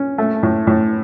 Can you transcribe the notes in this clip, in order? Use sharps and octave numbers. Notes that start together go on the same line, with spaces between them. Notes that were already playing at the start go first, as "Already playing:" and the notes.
Already playing: C#4
A3
A2
A2